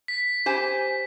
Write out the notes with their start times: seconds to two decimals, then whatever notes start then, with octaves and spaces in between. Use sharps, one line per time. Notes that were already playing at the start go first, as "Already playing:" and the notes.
0.08 B6
0.46 G4 C5 G#5